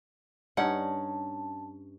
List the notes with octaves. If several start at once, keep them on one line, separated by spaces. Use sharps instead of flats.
G2 C#4 D#4 F#5 A5